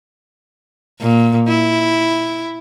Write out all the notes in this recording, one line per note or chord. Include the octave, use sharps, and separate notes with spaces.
A#2
E4